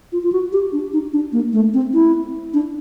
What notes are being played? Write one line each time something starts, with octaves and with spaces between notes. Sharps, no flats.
F4
F4
F#4
G4
D4
D#4
D4
A#3
A3
C4
E4
D4